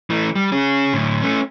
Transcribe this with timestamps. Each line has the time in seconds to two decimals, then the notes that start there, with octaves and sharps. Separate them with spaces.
0.10 E3 A3
0.35 G3
0.52 C#4 G#4
0.94 A2 D3
1.22 A3 C#4